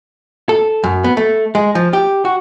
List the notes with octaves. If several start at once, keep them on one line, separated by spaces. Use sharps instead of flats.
A4
F#2
B3
A3
G#3
F3
G4
F#4